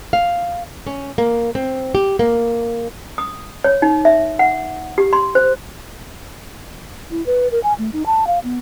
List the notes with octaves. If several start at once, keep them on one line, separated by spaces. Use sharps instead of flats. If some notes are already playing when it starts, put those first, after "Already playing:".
F5
C#4
A#3
C4
G4
A#3
D#6
C#5
D#4
E5
F#5
G4
C6
C5
E4
B4
A#4
G#5
A3
D#4
A5
F5
B3